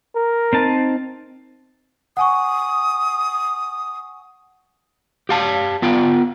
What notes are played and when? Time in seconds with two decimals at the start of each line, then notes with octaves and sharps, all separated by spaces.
0.16 A#4
0.53 C4 D#4 A5
2.17 F#5 G#5 C#6 D#6
5.29 G4 F5 A5
5.82 B3 F4 G5